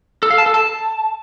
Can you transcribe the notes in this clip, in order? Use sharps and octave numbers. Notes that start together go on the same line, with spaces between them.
A4
F5
A5
A4
A5